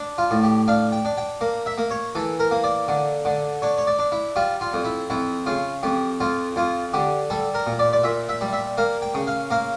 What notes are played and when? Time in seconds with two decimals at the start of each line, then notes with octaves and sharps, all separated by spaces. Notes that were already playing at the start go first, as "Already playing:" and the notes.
Already playing: D4
0.18 F4
0.31 A2
0.43 G4
0.68 D4 F5
0.92 G5
1.05 D4
1.17 G5
1.41 A#3
1.66 E5
1.78 A#3
1.91 C#5
2.15 E3 A4
2.40 A#4
2.51 A#3
2.64 D5
2.88 D3
3.25 D3
3.62 D4 C#5
3.78 C#5
3.87 D5
3.99 D4
4.12 E4
4.36 G3 F4
4.61 F4
4.73 F2
4.84 E4
5.10 F2 E4
5.46 C#3 F4
5.83 F2 G4
6.20 F2 F4
6.56 F2 F4
6.93 D3 G4
7.30 G3 A4
7.55 A#4
7.67 A#2
7.79 D5
7.93 D5
8.03 A#2 E5
8.29 E5
8.41 G3
8.53 E5
8.78 A#3 F5
9.02 G5
9.14 C#3
9.27 F5
9.51 A#3 F5